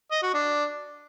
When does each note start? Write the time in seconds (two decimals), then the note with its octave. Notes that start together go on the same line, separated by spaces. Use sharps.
0.11 D#5
0.23 F#4
0.34 D4